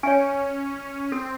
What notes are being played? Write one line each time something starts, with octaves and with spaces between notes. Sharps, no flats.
C#4 C#5 E5 G#5
C4 A4